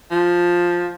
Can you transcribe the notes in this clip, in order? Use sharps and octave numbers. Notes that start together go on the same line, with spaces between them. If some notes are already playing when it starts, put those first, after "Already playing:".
F3